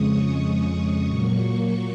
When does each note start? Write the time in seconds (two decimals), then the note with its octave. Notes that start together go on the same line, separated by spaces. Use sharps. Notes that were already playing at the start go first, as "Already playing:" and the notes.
Already playing: F2 C#3 G#3 C#6 D#6
0.27 C#6
0.67 D#6
1.06 A#2 F#3 A#3 C#6